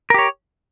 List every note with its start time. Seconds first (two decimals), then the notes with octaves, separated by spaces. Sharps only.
0.10 A#4
0.14 G4
0.19 C#5